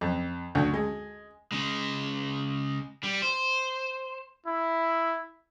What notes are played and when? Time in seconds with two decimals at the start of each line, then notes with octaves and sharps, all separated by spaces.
0.01 F2
0.55 D2
0.74 G#3
1.52 C#3 G#3
3.03 G3
3.22 C5
4.46 E4